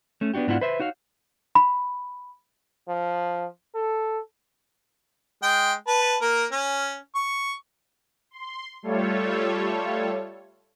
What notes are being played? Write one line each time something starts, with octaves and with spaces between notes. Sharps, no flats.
A3 C#4
B3 D4 D#4 F#4 G4
G#2 B3 D4 E4 F4 F#5
B4 C5 E5
D#4 F#4 C#5 F5
B5
F3
A4
G#3 G5
B4 A5
A#3 A#4
C#4
C#6
C6
G3 A3 F4 A4 C#5